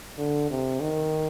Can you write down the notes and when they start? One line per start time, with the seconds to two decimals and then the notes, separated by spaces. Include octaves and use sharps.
0.18 D3
0.50 C3
0.81 D#3